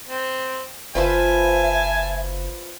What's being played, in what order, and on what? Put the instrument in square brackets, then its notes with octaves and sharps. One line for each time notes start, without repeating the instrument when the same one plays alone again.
[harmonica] C4
[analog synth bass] F#1 [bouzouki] F4 B4 C5 [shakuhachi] E5 [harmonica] G#5 A5